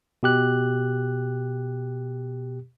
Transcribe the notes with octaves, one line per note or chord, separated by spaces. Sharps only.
B2 G4 F#6